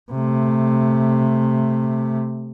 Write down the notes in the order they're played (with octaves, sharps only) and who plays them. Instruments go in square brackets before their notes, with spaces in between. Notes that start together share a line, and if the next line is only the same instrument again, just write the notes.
[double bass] C3 A3